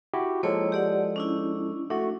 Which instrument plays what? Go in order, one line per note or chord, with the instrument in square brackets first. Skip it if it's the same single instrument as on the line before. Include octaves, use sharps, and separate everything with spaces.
[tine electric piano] E4 F#4 G4
[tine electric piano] F3 G#3 A4 [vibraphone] A#3 E4 C#5
[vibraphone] G4 D5 F#5
C#4 D4 E4
[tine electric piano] A3 F#4 [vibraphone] D4